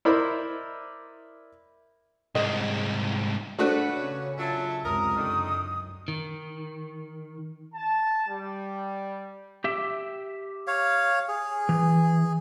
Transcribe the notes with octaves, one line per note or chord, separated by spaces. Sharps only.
E4 A#4 C5 D5 D#5 B5
C2 G#2 G#4 D#5
A3 D4 F#4 B4 F#5
C#3 C#4 C#5
F#3 F4 E5 A5
C#2 F#2 C3 A#4 D#6
F#2 D3 D#3 D#4
D#3
A5
G3
G4 E5
C#5 F5
G#4
E3